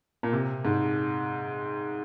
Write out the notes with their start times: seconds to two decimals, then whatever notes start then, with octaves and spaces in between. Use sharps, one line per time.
0.23 A#2
0.33 C3
0.65 G#2